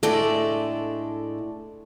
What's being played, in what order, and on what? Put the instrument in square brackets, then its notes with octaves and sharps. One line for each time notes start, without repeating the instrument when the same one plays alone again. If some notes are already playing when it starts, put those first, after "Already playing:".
[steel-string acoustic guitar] A2 G#3 D4 A4 D5 [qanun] A3